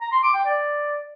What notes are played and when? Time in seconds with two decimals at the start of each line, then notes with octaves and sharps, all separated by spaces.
0.01 A#5
0.12 C6
0.23 D6
0.34 G5
0.45 D5